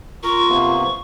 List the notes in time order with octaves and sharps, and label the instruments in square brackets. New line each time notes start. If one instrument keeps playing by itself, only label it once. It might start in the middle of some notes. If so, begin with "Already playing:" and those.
[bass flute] F4 [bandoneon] A#4 [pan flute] C#6
[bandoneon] C3 A#3 B3